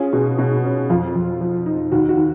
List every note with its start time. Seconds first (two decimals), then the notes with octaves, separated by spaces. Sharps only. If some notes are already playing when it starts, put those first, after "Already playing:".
Already playing: C#4 F4 G#4
0.13 B2
0.38 B2 F#4
0.64 C#4
0.90 F2 F4
1.15 F2
1.41 F3
1.66 D#4
1.92 D#2 F#4
2.09 F#4
2.17 D#3